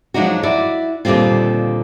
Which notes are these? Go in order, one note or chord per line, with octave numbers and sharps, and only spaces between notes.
F3 F#3 G#3 D4 D#4 F#4
E4 F#4 D5
D#2 A#2 D3 G3 C4 F4